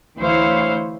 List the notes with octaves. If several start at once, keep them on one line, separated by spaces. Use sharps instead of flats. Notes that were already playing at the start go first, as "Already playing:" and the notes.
D2 E3 E4 C5 C#5 F5